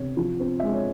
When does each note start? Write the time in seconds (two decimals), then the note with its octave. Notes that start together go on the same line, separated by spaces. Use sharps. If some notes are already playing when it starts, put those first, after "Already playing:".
Already playing: C3 C#5
0.17 F3
0.40 C4
0.60 G#3 E5
0.73 C#5